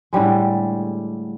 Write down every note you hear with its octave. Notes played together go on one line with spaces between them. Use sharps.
A2 D3 G3 G#3